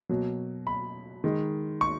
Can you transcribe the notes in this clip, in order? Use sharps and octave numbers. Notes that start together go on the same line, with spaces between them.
B2 F#3 A#3
B5
D#3 G#3
C#6